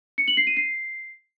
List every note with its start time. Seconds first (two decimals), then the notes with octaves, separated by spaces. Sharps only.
0.18 C#7
0.28 F#7
0.37 C7
0.47 D#7
0.57 C7